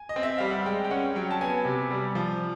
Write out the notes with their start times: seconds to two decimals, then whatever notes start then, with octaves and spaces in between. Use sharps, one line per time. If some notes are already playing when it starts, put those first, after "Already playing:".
Already playing: G#5
0.09 D#5
0.16 C4
0.23 E5
0.38 G3 F5
0.51 F#5
0.66 G#3 G5
0.84 G5
0.90 C#4 F#5
1.16 F#3 G5
1.31 A5
1.41 B3 G#5
1.65 C3
1.91 G3
2.15 F3